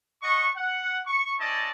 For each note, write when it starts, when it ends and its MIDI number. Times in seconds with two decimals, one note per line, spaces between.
0.23 0.48 62
0.23 0.48 75
0.23 0.48 78
0.23 0.48 85
0.56 1.00 78
1.06 1.33 85
1.40 1.70 59
1.40 1.70 61
1.40 1.70 64
1.40 1.70 74
1.40 1.70 75
1.40 1.70 81